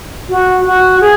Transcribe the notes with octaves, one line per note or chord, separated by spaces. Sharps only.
F#4
F#4
G#4